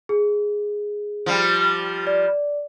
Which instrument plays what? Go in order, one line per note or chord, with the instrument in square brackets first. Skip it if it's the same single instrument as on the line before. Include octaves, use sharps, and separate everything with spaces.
[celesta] G#4
[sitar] F3 G3
[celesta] D5